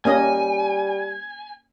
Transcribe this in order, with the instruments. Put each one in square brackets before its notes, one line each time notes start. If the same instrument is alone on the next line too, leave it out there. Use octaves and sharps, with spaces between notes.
[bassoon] G3 [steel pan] A#3 C#4 D#5 [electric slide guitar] G#5